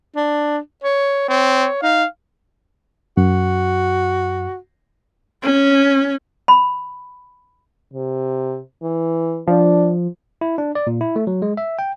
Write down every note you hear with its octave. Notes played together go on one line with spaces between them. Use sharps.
D4
C#5
C4 C#5
D#4 F5
F#2 F#4
C#4
B5
C3
E3
F3 D4
E4
D4
D5
A#2
E4
A3
F#3
G#3
E5
G5